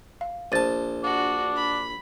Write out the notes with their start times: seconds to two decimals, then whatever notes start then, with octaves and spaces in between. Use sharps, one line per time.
0.21 F5
0.52 A#1 C5 A5 A6 D#7
1.04 D4 F#4
1.56 B5